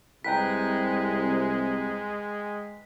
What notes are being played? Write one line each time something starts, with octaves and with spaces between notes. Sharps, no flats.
C2 C3 G#3 B4 G5 A#5 B6